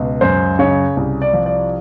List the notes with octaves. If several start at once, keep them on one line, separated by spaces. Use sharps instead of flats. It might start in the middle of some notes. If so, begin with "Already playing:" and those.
Already playing: C#2 B2
F#2 C5
C#3 C#5
C2
D5
F3
D5